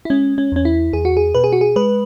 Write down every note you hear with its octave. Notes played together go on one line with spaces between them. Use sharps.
E4
G#3 C#4
C#4
E2 C#4
E4
E2 G#4
F#4
G#4
B2 B4
G#4
F#4
G#4
G#3 B4